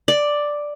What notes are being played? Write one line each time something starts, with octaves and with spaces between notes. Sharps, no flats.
D5